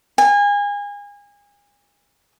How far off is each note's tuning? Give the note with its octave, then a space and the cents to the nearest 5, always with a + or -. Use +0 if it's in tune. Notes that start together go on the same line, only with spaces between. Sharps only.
G#5 -30